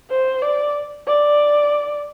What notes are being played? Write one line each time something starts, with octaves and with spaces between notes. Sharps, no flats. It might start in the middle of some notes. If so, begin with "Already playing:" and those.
C5
D5
D5